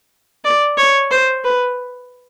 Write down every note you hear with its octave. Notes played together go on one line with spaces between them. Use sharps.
D5
C#5
C5
B4